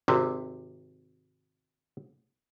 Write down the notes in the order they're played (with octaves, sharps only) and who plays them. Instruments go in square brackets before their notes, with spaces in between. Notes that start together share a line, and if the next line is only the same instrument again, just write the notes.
[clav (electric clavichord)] G#1 C3